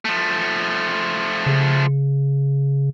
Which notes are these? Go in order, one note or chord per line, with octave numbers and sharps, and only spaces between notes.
F3 A3
C#3